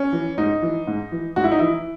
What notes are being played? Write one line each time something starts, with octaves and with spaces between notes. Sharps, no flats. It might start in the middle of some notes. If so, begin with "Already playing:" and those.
Already playing: C#4
E3
G#2 D#4
E3
G#2
E3
G#2 F#4
E4
D#4
E3 E4